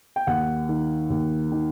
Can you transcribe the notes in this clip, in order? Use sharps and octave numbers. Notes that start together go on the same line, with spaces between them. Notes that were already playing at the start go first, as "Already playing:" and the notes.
G5
D#2 F#5
D#3
D#2
D#3